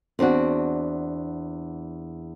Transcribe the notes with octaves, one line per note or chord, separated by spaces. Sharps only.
E2 C4 D4 F#4